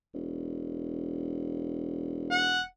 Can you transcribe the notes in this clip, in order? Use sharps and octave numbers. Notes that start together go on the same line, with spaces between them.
E1
F#5